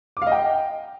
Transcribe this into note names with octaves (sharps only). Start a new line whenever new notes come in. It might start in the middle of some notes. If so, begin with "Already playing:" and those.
D6
F5
D#5
G5